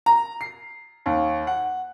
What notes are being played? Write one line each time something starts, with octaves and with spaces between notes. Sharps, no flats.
A#5
C7
D#2
F#5